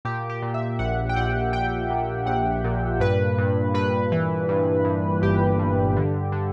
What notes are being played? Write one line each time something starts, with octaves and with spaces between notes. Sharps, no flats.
A#2 G4
G4
A#2
E5
A#1 F#5
G5
A#1 F#5
A#1 G5
A#2
A#1 F#5
A#2
G2 B4
G2
G2 B4
E3
G2
G2
G1 G4
G2
D3
D3